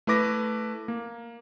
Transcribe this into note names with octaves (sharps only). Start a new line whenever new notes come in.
A3 E4 B4 D6 A#6
A#3